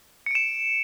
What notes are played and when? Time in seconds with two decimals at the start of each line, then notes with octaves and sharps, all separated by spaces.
0.26 C#7
0.31 D7
0.35 E7